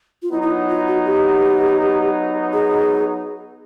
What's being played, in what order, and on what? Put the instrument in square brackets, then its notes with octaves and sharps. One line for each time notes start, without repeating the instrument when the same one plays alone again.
[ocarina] F4
[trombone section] F#3 B3 D#4 [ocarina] E4
[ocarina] E4
F4
F4
F#4
G4
G#4